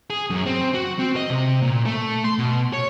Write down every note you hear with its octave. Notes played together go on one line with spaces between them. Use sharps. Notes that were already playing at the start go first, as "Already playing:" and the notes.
G#4
F#2
C4
F#4
C4
D#5
C3
A#2
A3
C6
B2
C#5